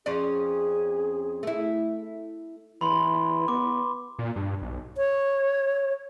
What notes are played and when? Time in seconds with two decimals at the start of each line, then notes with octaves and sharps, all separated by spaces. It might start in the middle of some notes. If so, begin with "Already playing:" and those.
0.06 F2 C#4 G#4 D5
1.43 A3 E4
2.81 E3 B5 C6
3.48 B3 D6
4.19 A#2
4.36 G2
4.62 B1
4.97 C#5